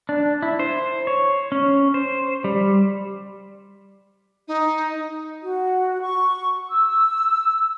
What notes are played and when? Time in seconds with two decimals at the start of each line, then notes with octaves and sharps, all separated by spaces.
0.09 D4
0.42 E4
0.59 C5
1.07 C#5
1.52 C#4
1.94 C5
2.44 G3
4.48 D#4
5.43 F#4
6.01 C#6
6.68 E6